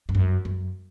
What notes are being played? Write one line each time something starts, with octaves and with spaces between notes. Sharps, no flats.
G2
F#2
F#2